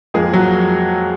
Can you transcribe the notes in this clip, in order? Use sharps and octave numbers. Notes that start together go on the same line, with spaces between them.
F2 F3 G#3 A#3 G#4
F#3 F#4